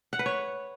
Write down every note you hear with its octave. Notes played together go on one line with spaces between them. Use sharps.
F#5
B4
C#5